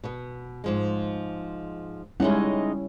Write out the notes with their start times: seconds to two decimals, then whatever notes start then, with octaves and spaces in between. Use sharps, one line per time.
0.04 B2 B3
0.64 G#2 F3 G#3
2.20 G3 G#3 C#4 D#4 E4 F#5